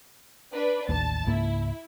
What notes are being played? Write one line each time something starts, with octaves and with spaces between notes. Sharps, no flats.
D4 B4 D5
A1 D#2 A5 A6
C#2 G#2 A#3 E4